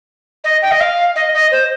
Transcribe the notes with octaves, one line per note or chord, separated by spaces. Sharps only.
D#5
G5
D#5
F5
D#5
D#5
C5